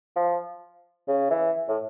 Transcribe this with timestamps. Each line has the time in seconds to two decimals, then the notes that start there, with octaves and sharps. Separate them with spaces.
0.16 F3
1.08 C#3
1.30 E3
1.69 A2